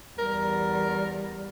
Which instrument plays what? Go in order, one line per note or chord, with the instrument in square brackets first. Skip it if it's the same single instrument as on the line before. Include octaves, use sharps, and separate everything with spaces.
[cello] E2 G3 [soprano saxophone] A#4